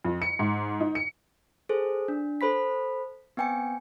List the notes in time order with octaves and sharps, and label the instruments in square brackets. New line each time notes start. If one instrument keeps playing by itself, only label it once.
[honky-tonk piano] F2
C#7
G#2
D#4
C#7
[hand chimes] G#4 A4 C5
D4
A4 C5 B5 B6
B3 C4 G5 G#5 C#7